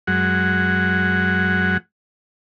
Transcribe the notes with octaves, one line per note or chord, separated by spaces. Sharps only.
F#2 F#3 G#3 F#5